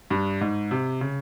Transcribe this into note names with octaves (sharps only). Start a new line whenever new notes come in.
G2
G#2
C3
C#3